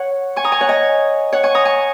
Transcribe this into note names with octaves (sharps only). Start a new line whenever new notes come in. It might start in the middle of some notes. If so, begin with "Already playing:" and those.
Already playing: C#5 F#5
G#5 C#6
A#5 D#6
G#5 C#6
C#5 F#5
D#5 G#5
C#5 F#5
G#5 C#6
A#5 D#6
G#5 C#6